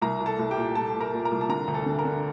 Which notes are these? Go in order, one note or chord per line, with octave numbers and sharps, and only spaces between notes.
C2 A#4 A#5
C2
A4 A5
C2
G4 G5
A#2
A#2 A4 A5
A#2
A#4 A#5
A#2
A#4 A#5
C2
A5
D3 A#4 A#5
D2
A4 A5
D3
A#4 A#5
D3